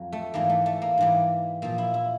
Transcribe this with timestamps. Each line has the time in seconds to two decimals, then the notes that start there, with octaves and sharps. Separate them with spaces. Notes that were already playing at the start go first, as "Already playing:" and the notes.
Already playing: F2 F#3
0.13 A3
0.34 G#2 E3 G3 A#3
0.50 A3
0.66 A3
0.82 A#3
0.98 G#2 E3 G3
1.62 A#2 F3 A#3
1.78 E4
1.94 E4